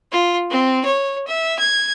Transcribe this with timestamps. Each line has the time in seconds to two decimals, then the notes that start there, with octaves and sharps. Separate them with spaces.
0.12 F4
0.50 C4
0.85 C#5
1.28 E5
1.59 G#6